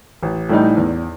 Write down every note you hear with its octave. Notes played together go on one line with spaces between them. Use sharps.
A1
A2 E3 G3 D#4
E2